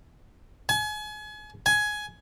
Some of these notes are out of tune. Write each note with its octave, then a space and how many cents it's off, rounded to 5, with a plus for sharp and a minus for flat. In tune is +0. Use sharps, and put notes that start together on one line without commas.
G#5 +35
G#5 +15